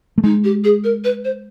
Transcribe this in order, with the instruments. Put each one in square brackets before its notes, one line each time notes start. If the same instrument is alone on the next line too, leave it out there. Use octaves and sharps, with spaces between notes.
[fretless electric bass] A3
[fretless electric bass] G#3 [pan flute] D#4
[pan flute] G4
G#4
A#4
B4
C5